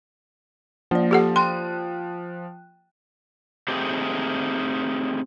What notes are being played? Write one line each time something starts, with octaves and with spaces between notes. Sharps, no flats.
F3 A#3 D5
G4 A4 F#5
G5 C6 F#6
A3 C4 D#4 G4 G#4